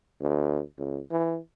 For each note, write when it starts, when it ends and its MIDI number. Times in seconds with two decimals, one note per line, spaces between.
0.21 0.61 38
0.78 1.00 37
1.11 1.38 52